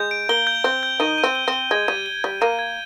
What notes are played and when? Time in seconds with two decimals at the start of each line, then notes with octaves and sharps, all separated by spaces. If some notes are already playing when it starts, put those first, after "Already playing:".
Already playing: G#3 G6
0.11 D7
0.29 A#3 G7
0.47 G6
0.64 C4 G6
0.83 G6
1.00 D#3 D#4 D#7
1.18 D#7
1.24 C4
1.35 G7
1.48 C4 G7
1.71 G#3 G#6
1.88 G3 D#7
2.06 G7
2.24 G3 G#6
2.41 A#3 D#7
2.59 G#6